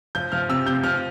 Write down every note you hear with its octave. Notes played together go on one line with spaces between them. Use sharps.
F3 G6
F3 F6
C3 E6
C3 G6
F3 F6